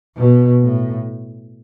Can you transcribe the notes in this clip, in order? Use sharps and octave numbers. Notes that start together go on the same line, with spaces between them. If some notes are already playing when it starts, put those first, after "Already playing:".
B2
A2